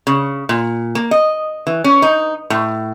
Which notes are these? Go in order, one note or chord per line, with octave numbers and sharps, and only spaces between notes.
C#3
A#2
A#3
D#5
E3
C#4
D#4
A2